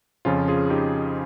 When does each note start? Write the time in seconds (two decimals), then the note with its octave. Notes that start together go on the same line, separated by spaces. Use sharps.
0.25 F2 C#3 F3 C#4 F4
0.48 F4 G#4
0.70 D#4 G4